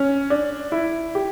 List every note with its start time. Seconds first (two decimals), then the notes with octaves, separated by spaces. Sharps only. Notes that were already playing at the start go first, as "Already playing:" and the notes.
Already playing: C#4
0.30 D4
0.72 E4
1.15 G4